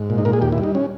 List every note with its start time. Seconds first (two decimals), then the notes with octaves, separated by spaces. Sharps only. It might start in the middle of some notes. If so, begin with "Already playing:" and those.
Already playing: G#2
0.10 A#2
0.18 D#4
0.25 A#2 A#4
0.33 G#4
0.41 D#2 G4
0.52 E4
0.58 G3
0.63 D#4
0.75 C#4